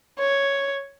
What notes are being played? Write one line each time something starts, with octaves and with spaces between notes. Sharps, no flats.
C#5